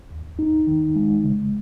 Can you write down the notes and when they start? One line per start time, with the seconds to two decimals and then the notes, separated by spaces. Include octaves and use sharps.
0.11 D#2
0.39 D#4
0.67 D#3
0.96 G#3
1.24 C#3